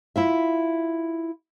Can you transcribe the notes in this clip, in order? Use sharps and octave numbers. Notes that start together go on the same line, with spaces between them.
E4 F4 E5